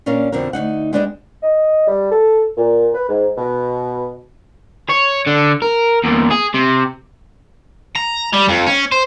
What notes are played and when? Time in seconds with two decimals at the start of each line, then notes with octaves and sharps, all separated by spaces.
0.06 A#2 C#4 D4 A#4 F5
0.32 F2 B2 D3 C4 A#4
0.53 D2 B2 D#4 F#5
0.93 G#3 B3 D4 G4 D5 D#5
1.43 D#5
1.88 G3
2.12 A4
2.57 A#2
2.95 B4
3.09 G#2
3.37 B2
4.89 C#5
5.26 D3
5.62 A#4
6.04 E2 A#2
6.30 G#4
6.54 C3
7.95 A#5
8.33 G3
8.49 F2
8.67 C#4
8.92 C5